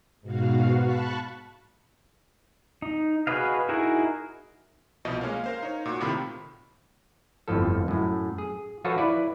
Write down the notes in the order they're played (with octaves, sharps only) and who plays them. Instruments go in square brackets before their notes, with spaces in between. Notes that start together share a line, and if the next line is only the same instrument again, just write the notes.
[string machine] G#2 B2 F#4 F5
A5 B5 C#6 F#6
[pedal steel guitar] D#4
F#4 G#4 B4 D#5 F5
D#4 E4 F#4 G#4 A#4
[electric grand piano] C2 B2 F3 D#5
G#3 A#3 C#4 A#4 F5
A#4 C5 F5
D#4 C#5
A#2 F#4
A2 C3 D#3 F4 B5
[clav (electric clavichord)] G1 F2 A2 F3 A4
F#2 A2
G#4
F3 F4 F#4 A4 B4 C#5
E4 B4 D5